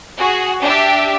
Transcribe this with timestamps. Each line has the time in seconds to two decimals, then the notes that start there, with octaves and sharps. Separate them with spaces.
0.17 F#4 G#4
0.61 D4 G4 E5